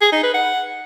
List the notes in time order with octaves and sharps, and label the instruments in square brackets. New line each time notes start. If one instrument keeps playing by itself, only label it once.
[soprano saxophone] G#4
D#4
B4
F#5